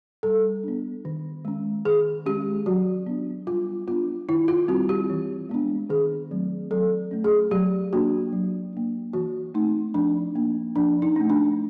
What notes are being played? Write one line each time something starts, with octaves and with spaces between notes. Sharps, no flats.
G3 A4
B3 D4
D#3
G#3 C#4
D#3 G#4
G#3 C#4 G4
F#3 F#4
B3 D4
G3 F4
B3 D4 F4
D#3 E4
F4
G3 C4 F#4
G4
E3
G#3 B3 D4
D#3 G#4
F#3 A3 C4
F#3 A4
A3 C#4
G#4
F#3 G4
A#3 D4 F#4
F#3
A#3 D4
E3 F#4
A3 C4 D#4
F3 D4
A#3 D4
F3 D4
D#4
A3 C#4
D4